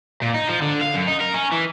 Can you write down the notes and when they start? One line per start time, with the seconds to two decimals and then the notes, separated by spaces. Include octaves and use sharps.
0.22 A#2
0.34 D#4
0.49 F3
0.62 D3
0.81 F5
0.94 F#2
1.07 D#4
1.20 A#4
1.34 C#4
1.52 E3